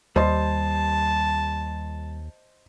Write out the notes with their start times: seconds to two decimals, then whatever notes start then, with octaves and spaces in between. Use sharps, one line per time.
0.16 D#2 G3 C5 D#5 A5 C6